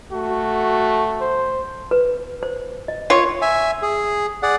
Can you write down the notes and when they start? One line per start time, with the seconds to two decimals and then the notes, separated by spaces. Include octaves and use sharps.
0.12 A3 F#4
1.21 C5
1.91 B4
2.43 C5
2.88 D#5
3.10 F4 C#5
3.42 E5 G#5
3.82 G#4
4.43 G#4 D5 F#5